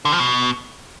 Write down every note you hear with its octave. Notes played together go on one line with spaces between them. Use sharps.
D3
F3
B2